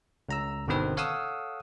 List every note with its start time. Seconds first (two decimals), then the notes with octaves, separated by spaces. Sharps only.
0.29 C#2 A#5 E6
0.67 G1 B2 D3 D#3 C4 B4
0.97 A4 C#5 F5 F#5 D#6 E6